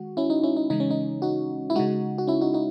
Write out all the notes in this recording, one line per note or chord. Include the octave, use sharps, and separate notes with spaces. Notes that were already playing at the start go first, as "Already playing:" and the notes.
Already playing: D#3 G#3 F#4
C#4 E4
D#4
C#4 E4
D#4
C#3 E3 G#3 D#4
C#4
D#4
D#4 F#4
E4
C#3 G#3 D#4 F#4
F#4
C#4 E4
D#4 F#4
D#4 F#4